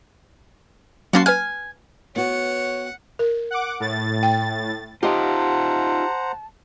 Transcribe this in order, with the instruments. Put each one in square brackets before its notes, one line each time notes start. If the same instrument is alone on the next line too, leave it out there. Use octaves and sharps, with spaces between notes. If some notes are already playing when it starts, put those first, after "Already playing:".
[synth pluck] F#3 A#3 C#4 [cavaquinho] F#4 A5 C6
[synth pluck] B4 F6 [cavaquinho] G#5
[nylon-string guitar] B3 F#4 [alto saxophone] C#5 [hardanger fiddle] F#5
[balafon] A#4
[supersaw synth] F#5 D6
A2 A6
[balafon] G5
[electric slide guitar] D#4 F4 [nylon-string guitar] G4 D#5 [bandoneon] C5 F#5 A#5 [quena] A5